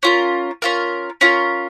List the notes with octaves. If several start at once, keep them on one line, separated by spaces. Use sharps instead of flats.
C#4 F4 A#4
C#4 F4 A#4
C#4 F4 A#4